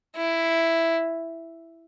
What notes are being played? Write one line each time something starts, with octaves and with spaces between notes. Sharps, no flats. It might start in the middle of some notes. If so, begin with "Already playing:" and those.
E4